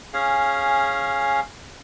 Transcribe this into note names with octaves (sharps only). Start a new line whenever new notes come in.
C#4 G#4 F5